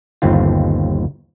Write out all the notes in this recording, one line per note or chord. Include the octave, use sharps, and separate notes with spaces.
G1 D#2 C4 F4